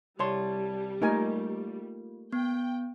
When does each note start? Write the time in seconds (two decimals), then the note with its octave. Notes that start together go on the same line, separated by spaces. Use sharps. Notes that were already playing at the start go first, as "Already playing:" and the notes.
0.19 C2 G3 C#5 D5 A5 C6
1.02 A3 A#3 D#4 F4 A#4 G#5
2.32 B3 G5